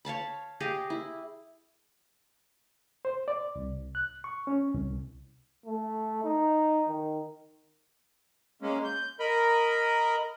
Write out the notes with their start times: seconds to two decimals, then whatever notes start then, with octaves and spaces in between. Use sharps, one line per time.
0.05 C#5 F5 A5 B5
0.60 G4 G#4 D#5 F5
0.90 E4
3.05 C5
3.28 D5
3.56 C2
3.95 F#6
4.24 C#6
4.47 C#4
4.74 C2
5.66 A3
6.24 D#4
6.88 D#3
8.62 G#3 A#3 C#4
8.84 G6
9.20 A#4 D#5 B5